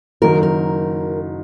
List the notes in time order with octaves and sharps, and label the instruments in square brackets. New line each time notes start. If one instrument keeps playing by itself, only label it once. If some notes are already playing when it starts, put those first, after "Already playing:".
[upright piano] F#1 F#2 D#3 F#3 [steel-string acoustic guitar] A#4
[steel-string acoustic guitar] A#4